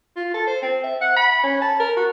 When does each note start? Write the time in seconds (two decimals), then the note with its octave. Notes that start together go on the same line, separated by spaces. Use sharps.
0.16 F4
0.34 A4
0.47 C5
0.62 C4
0.84 E5
1.01 F#5
1.17 B5
1.44 C#4
1.62 A5
1.80 A#4
1.97 F#4